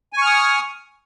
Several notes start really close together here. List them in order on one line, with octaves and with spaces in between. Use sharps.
G#5 C#6 F6 D#6